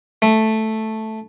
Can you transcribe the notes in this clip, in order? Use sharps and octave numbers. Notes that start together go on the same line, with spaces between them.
A3